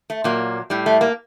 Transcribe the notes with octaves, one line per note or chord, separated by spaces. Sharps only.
A3
A#2 F#3 A#3
A2 G3
A3
A#3